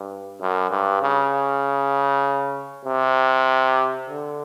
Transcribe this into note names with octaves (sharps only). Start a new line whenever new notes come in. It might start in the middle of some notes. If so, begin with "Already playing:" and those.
Already playing: G2
F#2
G2
C#3
C3
D3